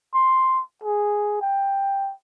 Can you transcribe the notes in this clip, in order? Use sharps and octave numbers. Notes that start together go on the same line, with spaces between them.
C6
G#4
G5